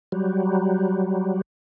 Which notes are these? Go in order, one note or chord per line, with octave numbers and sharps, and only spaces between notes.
F#3 G3